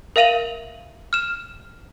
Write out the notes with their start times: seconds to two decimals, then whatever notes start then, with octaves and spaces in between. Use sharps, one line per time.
0.16 A#4 E5 F5 D#7 F7 F#7
1.13 F6 E7